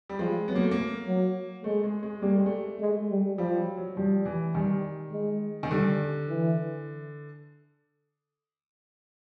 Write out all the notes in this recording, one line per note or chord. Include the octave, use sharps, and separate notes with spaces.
G3
F3 G#3
F#3 B3
A#3
A3
A#3
F#3
G#3 A3
G#3
G#3
G3 A#3
A3
G#3
A3
G#3
G3
F3 G3
F#3
F#3
F3 G3
E3
D#3 G3
G#3
D#3
D3 G3
E3